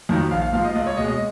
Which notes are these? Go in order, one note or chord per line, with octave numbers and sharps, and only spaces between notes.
F2 D#3 F#3
A#1 F5
F5
G#2 F3 F5
D#5
C#2 D#5
C#5
B2 G#3 D#5
D#5